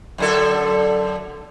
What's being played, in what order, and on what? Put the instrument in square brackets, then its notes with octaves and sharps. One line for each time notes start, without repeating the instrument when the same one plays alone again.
[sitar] F#2 D3 A4